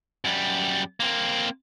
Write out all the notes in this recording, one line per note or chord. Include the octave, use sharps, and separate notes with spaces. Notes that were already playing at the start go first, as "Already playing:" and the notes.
F#2 G3
A#3 C4